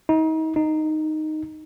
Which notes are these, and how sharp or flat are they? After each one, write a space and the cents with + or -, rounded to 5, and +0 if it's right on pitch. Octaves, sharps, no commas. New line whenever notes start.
D#4 +35
D#4 -5